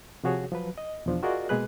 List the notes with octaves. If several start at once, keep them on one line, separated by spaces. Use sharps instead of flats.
C3 F3 F#4 G#4 C#5
F3 F#3 B4
D#5
E2 B2 F3 D4
F4 F#4 G#4 A#4 D5 D#5
B2 G#3 A#3 G#4 B4 F#6